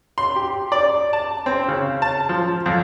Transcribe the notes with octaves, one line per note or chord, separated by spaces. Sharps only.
C6
G4
D5
A5
C4
C#3
A5
F3
F2